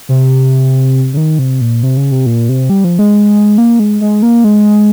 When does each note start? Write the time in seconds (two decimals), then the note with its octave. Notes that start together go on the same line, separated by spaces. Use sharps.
0.09 C3
1.14 C#3
1.17 D#3
1.39 C3
1.61 A#2
1.83 C3
1.97 C#3
2.12 C3
2.26 A#2
2.49 C3
2.70 G3
2.84 F3
2.99 G#3
3.58 A#3
3.79 G#3
4.01 G#3
4.22 A#3
4.44 G#3